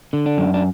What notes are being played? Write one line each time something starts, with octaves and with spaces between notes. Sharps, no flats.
D3
D4
F#2
D4